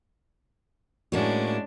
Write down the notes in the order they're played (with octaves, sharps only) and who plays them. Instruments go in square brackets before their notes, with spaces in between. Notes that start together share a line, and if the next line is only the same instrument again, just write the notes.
[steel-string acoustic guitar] A2 A#3 F#4 [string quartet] G#3 C#4 D4